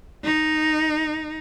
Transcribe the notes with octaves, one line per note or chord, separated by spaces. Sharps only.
D#4